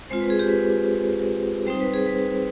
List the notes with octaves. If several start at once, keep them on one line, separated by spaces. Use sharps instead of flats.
G#3 C4 F4 C5
B4
G#4
G4
B4
G3 C4 D#4 C5
B4
G#4
B4